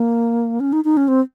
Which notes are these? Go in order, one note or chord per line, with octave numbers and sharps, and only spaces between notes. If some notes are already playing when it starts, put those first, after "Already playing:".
Already playing: A#3
C#4
D#4
D#4
C#4
C4